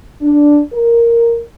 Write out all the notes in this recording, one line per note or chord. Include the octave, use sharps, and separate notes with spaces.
D4
A#4